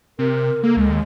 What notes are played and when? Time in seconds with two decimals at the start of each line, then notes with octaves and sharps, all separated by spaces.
0.19 C3 A#4
0.63 A#3 A4
0.77 C#2 G#3
0.90 D#2